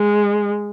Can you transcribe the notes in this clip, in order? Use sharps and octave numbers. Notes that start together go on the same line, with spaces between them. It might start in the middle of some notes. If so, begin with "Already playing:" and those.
Already playing: G#3